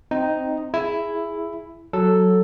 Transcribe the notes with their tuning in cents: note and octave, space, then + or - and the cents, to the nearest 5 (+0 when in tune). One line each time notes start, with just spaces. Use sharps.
C4 -5 D#4 +0
E4 +5 G#4 +0
F#3 +0 A4 +0